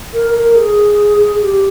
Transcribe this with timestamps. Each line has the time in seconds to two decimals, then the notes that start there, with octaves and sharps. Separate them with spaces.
0.13 A#4
0.34 A#4
0.55 G#4
1.42 G4